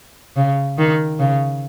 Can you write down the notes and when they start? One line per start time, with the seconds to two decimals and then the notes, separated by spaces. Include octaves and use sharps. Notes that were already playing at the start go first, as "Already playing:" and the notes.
0.36 C#3
0.78 D#3
1.19 C#3